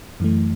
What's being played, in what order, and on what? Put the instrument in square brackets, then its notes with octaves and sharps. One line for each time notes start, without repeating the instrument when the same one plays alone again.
[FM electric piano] F#2 E3 A3